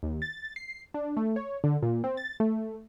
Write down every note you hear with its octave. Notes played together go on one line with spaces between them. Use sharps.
D#2
A6
C7
D4
A3
C#5
D3
A#2
C4
A6
A3